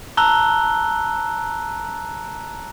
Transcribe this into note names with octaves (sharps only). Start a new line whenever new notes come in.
A5 A#5 E6 F#6 G7